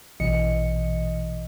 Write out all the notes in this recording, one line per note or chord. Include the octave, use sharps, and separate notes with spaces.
A#1 B2 E3 D#5 C#7